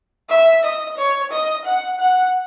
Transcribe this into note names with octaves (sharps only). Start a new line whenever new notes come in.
E5
D#5
C#5
D#5
F#5
F#5